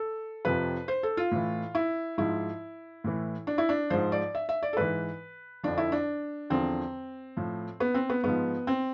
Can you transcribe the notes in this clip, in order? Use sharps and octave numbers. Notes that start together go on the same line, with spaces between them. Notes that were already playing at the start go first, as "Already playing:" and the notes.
Already playing: A4
F2 C3 F3 B4
C5
A4
F4
A2 E3
E4
G#2 F3 E4
A2 E3
D4
E4
D4
G#2 F3 C5
D5
E5
E5
D5
A4
G#2 E3 B4
F2 D3 F3 D4
E4
D4
E2 D3 F3 C4
A2 F3
B3
C4
B3
G#2 F3 B3
C4